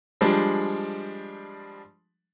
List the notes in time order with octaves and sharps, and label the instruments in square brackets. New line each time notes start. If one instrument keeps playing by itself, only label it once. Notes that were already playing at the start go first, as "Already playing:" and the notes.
[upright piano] F3 G3 G#3 D4